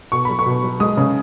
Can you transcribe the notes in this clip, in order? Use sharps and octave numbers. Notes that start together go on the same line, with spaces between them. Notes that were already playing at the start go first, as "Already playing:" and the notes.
B2 C#6
F#3 B5
C#6
B2
F#3
G#3 D#6
C#3